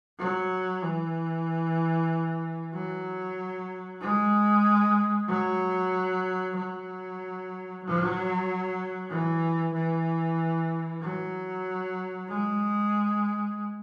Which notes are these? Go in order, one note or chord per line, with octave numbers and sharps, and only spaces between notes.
F#3
E3
F#3
G#3
F#3
F#3
F#3
E3
E3
F#3
G#3